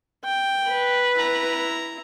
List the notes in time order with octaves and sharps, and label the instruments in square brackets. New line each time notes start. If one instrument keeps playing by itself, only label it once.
[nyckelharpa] G5
[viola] B4
[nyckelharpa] E4 A#5